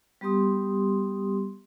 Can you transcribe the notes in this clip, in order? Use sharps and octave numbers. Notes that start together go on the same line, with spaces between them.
G3 B3 G4 C6 D#6